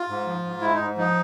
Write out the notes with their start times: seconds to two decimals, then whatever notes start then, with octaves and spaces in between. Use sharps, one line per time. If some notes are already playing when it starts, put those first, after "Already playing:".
Already playing: F4
0.09 G#2
0.27 F3
0.44 G#2
0.61 G#3 E4
0.74 D#4
0.80 G#2
0.97 F3 D#4